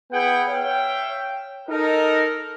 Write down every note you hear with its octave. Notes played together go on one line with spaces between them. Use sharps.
B3 E4 G#4 F#5 G5
C#5 E5 F5 G5
D#4 A4 A#4